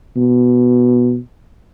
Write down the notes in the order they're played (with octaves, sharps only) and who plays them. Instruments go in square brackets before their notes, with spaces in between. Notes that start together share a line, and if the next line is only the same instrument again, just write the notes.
[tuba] B2